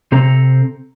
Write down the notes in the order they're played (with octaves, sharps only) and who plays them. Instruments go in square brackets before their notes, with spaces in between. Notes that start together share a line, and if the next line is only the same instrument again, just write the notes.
[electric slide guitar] C3 C4 A4 A#5